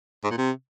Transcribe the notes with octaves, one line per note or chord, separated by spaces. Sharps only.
G#2
A#2
C3